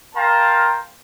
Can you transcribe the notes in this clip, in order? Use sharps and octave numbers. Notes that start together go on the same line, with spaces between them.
A#4 F5 G5 A5 A#5 C6